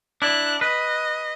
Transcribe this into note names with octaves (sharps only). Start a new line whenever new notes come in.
D4 E4 F#6
B4 D#5